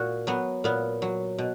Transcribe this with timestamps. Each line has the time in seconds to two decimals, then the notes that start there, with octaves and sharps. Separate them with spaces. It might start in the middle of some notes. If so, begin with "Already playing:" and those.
Already playing: A#2 F#4
0.27 F#3 B3
0.64 A#2 B3
1.02 F#3
1.38 B2